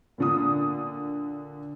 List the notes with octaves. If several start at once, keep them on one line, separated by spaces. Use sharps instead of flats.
A#2 D3 D#6